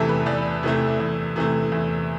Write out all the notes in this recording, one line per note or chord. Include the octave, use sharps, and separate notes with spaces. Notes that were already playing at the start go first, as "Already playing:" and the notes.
Already playing: E2 C3 E3 A3 G4 A4
B4
E2 D5
C3 E3 A3
E2
C3 E3 A3
E2